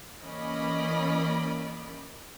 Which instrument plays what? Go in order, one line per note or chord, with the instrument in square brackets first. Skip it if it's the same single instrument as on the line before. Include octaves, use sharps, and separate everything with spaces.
[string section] E3 A#3 C#4 D5 D#5 B5